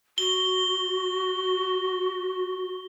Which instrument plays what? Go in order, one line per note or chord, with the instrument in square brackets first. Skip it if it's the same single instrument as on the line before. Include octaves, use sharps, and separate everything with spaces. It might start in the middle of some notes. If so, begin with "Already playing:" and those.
[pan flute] F#4 [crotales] G7